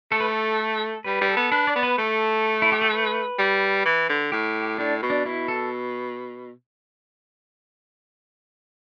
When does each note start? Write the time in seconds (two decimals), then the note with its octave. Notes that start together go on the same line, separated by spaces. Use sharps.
0.11 A3 A4
0.20 B4
0.28 A4
1.04 G3 B4
1.21 G3
1.29 A4
1.36 B3
1.52 D4 B4
1.67 D5
1.76 B3
1.83 B4
1.98 A3 A4
2.62 E4
2.72 G4
2.82 A4
2.92 B4
3.39 G3
3.85 E3
4.09 D3
4.32 A2 G4
4.78 A2 D4
5.02 B2
5.10 D4
5.25 B2 E4
5.48 A4